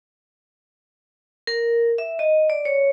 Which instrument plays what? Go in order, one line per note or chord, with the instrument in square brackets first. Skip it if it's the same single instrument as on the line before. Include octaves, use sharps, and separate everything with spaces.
[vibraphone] A#4
E5
D#5
D5
C#5